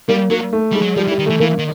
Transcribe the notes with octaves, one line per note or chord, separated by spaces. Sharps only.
G3 A#3
F#3 A#3
A3
G3 G#3
F#3
F3 G3
E3
G3
D#3
E3 A3
E3 A#3
D#3